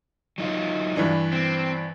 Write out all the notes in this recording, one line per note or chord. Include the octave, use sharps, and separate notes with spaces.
F#3 D#4 F4
G2 E3 D4
C4